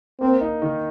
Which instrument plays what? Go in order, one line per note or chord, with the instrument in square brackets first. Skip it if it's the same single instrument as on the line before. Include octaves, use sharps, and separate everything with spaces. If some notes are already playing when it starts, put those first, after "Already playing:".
[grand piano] A#3 [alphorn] C4
[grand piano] D#4
D#3